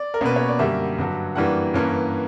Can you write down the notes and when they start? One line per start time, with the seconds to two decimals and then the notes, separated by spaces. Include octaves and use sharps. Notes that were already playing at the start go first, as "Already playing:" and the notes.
Already playing: D5
0.14 A#4
0.21 B2 A#3 C#4 B4
0.36 C#5
0.48 D5
0.59 F#2 D3 G3 A#3 E5
0.98 G2 D3 F#3
1.35 F#2 E3 G3 A#3 D4 F#5
1.74 G2 E3 A#3 C#4